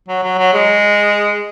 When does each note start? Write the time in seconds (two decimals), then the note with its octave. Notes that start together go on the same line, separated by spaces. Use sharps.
0.08 F#3
0.23 F#3
0.39 F#3
0.54 G#3